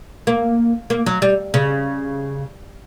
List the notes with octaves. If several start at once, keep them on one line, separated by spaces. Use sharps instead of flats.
A#3
A#3
F#3
G3
C#3